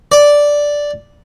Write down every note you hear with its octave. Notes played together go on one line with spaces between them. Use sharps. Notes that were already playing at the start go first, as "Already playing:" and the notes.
D5